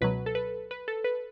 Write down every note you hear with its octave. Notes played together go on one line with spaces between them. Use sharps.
C#2 B2 F#3 B4
A4
B4
B4
A4
B4